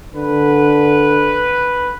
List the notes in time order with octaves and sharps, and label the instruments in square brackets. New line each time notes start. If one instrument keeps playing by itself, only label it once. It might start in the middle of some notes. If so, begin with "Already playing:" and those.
[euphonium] D3 [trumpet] B4